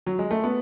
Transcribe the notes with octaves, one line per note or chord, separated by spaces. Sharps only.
F#3
G#3
A3
B3